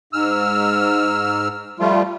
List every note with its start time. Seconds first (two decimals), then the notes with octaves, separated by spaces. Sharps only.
0.13 G#2 E6 F6
1.80 F3 G3 A3 F4